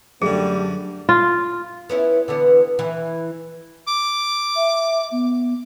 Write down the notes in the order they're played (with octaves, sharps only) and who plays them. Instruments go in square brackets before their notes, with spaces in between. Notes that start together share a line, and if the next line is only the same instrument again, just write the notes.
[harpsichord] F#2 D3 [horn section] G3 A3 [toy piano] G#4
[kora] F4
[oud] B3 C#4 E4
D3 E3 B3
E3
[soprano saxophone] D6
[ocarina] E5
B3